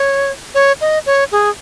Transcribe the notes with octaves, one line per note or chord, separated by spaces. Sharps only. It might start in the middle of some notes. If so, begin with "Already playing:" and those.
Already playing: C#5
C#5
D#5
C#5
G#4